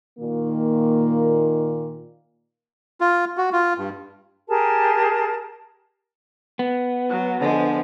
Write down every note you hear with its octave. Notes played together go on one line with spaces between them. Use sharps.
A#2 D#3 A#3
F4
F#4
F4
G2
G4 G#4 A#4 A5
B3
F#3
D3 F3 G#3